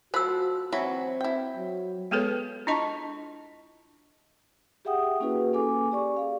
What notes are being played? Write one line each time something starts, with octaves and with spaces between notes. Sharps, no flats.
F3 F#4 C5 B5 E6
E3 F#3 C4 B5
E4 G5
F#3
G#3 B3 G#4 A4 B4 C#5
D4 E4 F4 D#5 A5 C#6
G4 G#4 E5 F#5 G5 D#6
A#3 C#4 E4 F#4 G#4 B4
A#3 C#4 A4 G#5 D6
G4 D5 C#6
G#4 F5